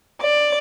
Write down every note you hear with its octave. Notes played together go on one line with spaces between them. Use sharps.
D5